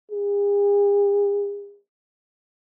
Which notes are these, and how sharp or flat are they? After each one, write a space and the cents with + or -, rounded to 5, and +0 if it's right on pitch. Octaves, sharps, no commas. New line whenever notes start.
G#4 -45